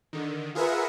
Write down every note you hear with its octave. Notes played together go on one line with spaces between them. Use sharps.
D3 D#3
F4 G#4 A#4 B4 E5 F#5